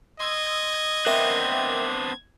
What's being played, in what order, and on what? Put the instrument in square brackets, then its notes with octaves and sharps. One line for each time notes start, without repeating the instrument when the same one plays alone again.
[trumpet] D#5 [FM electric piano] C6 D#6 E6 [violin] G#6
[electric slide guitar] B3 C4 D4 [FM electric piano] A#4 E5 G5